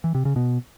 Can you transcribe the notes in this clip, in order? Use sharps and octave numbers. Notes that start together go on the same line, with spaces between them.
E3
C3
C#3
B2